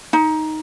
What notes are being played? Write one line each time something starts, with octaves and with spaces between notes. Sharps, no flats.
D#4